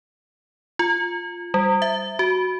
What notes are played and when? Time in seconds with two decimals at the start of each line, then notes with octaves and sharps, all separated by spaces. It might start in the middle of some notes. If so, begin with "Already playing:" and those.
0.79 F4
1.54 G3
1.82 E5
2.19 F#4